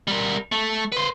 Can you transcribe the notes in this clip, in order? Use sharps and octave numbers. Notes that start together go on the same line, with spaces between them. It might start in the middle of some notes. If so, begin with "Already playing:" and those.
G3 A#4
A3
B4 C5